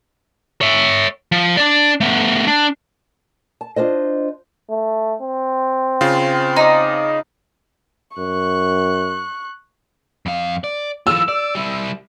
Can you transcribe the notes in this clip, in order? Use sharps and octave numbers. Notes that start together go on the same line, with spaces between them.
C#5 E5
F3
D4 D5
A3 B3
D4
A5
D4 F4 C5 D#5
A3
C4
C#3 F4
D#4 D5
F#2 C#6 F#6
F2 F5
D5
E3 F4 E6
D5
G3 E4